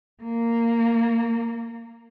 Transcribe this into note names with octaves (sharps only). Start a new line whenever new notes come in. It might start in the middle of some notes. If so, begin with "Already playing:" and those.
A#3